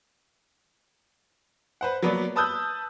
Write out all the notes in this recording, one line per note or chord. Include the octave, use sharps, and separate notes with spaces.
B4 C5 F#5
F#3 A#3 B3 B4 D5
B4 A5 D#6 E6 F#6 G6